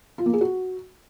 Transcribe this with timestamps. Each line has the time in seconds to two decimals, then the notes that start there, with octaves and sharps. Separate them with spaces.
0.18 F4
0.26 A#3
0.33 G#4
0.41 F#4